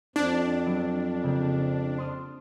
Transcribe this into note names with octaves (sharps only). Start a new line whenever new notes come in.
F2 D4 G#6 D7
F#3 B3 D7
C#3 A#3 G4
C6 D#6 F6